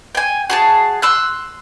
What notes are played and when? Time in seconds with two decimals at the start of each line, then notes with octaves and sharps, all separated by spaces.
0.15 G5 G#5
0.50 F#4 G#4 A5
1.02 C6 E6 F#6